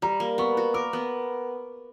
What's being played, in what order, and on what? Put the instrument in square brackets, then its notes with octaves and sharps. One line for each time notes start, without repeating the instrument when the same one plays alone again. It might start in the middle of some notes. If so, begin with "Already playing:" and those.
[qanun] G3 [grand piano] A#5
[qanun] A#3
[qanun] B3 [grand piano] C#6
[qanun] F#4
[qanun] A#4 [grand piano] D6
[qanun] B3